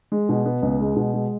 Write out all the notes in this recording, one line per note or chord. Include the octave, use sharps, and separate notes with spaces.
G#3
B2
B3
C#2
G#3
B2
G#3